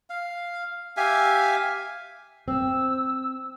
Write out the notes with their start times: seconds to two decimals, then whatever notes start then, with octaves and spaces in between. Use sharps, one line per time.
0.10 F5
0.97 G4 E5 F5 G#5
2.48 C4 E6